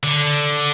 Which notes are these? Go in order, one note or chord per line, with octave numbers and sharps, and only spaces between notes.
D3